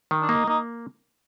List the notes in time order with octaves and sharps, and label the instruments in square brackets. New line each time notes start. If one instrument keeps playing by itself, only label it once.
[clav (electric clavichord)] D#3
[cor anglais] D4
[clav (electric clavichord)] A#3 [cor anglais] D#4
[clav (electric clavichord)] A#3 [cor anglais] D#4